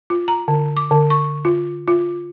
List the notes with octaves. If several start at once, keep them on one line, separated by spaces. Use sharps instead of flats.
F4
A#5
D3
D6
D3
C#6
F4
F4